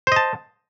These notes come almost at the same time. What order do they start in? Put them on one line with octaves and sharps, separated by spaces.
C5 D#5 A5